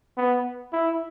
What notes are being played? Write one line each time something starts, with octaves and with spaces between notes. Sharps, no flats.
B3
E4